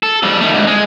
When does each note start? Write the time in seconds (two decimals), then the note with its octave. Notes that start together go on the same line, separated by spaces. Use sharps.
0.03 A4
0.23 F2 G3
0.41 D#3 A3
0.52 D2 G#2
0.67 G#3